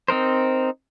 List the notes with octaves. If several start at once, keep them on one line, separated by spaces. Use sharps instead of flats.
C4 D#4 A#4 C5